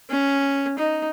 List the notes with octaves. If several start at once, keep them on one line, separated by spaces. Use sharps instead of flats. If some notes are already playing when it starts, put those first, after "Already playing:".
C#4
D#4